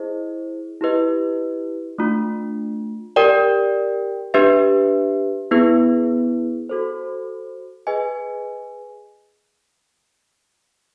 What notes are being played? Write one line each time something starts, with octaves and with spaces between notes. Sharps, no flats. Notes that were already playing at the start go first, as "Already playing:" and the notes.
Already playing: E4 G#4 C5 D#5
E4 G4 B4 D#5
A3 D4 F4
G4 A#4 D5 G5
D4 G4 B4 E5
B3 E4 G#4 B4
F#4 A4 C5
G#4 B4 D#5 G#5